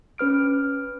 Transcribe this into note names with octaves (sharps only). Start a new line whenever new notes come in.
C#4 B4 F6 D7